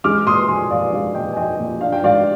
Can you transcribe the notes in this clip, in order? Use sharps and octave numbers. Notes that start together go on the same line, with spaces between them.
G#3 D6 F6
A#2 C6 D#6
F3 G#5 C6
A#2 D5 F5
G#3 D5 F5
A#2 D#5 G5
G#5
F3 D#5 G5
A#2
D4 F5
G5
G#2 D5 F5